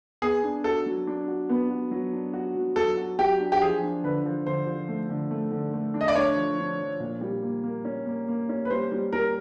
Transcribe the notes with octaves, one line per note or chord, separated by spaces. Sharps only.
B3 G#4
D4
F#4 A4
F#3
D4
F#4
B3
F#4
F#3
D4
F#4
F#3
F#3 A4
F#4
F#3 G4
D4
G4
F3 G#4
D4
D3 B4
F3
D3 C5
F3
A3
D3
A3
D3
A3
D4
D#5
D5
D4 C#5
F3
D4
F3
A#2
G3
A#3
A#3
C#4
A#3
A#3
C#4
B4
G3 C5
G3
G3 A#4